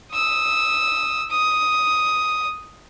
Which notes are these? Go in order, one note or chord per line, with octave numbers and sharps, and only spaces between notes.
D#6 E6
D#6